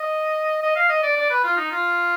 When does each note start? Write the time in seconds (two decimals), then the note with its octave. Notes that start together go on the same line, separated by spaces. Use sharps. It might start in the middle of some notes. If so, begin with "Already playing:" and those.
Already playing: D#5
0.63 D#5
0.76 F5
0.90 D#5
1.03 D5
1.17 D5
1.30 B4
1.44 F4
1.57 D#4
1.71 F4